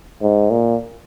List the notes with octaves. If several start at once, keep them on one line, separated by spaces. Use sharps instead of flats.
G#2
A#2